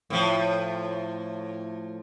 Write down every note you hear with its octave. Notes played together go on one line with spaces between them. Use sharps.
A2 F3